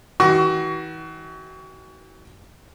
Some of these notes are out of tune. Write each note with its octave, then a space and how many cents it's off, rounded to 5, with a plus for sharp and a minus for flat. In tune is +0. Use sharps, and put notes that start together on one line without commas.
E3 -40 F#4 +30 C#6 +25